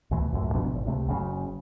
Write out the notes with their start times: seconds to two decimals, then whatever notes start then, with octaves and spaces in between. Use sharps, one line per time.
0.11 D2 B2 E3 A3
0.32 C#2 F#2 A2
0.54 A1 B2 F3 D4
0.74 G#1
0.86 C#2 C3 A3
1.08 F#1 C#3 F#3 C#4